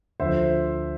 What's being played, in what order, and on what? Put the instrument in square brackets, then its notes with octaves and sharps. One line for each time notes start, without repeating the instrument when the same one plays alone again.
[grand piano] D2 D3 F3 C5 E5